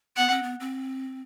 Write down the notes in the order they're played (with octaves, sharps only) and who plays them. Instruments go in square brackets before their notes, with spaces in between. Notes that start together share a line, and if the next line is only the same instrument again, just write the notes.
[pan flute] B3 [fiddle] F#5
[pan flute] C4
B3
C4